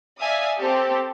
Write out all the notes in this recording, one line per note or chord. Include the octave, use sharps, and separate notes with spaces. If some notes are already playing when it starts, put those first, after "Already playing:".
D5 E5 F5 G#5 D#6
C4 G4 A4